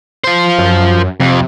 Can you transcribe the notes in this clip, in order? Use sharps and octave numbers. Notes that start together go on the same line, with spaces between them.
F3 C5
F#2
F2 C3